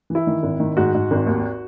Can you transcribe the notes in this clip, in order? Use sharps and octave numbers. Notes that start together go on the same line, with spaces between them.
E3 E4
D#3
G#1
D#3
G#2 F#4
G#2
G#1
D#2